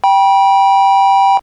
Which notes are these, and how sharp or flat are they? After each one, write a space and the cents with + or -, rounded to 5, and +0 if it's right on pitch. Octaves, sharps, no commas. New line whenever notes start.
G5 +0 B5 -35